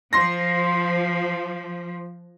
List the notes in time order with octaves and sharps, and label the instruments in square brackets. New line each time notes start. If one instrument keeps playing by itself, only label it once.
[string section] F3 [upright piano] C6 A#6